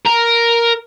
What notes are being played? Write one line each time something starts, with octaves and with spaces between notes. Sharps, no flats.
A#4